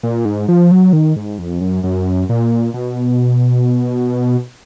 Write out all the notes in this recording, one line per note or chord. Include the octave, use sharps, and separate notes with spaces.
A#2
G#2
F3
F#3
D#3
G#2
F2
F#2
F#2
A#2
B2